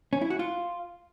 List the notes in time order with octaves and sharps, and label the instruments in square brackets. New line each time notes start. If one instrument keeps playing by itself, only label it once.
[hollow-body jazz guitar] C#4
E4
F#4
F4